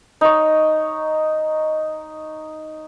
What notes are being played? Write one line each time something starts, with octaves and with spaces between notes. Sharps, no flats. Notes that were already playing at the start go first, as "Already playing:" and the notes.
D#4 C#5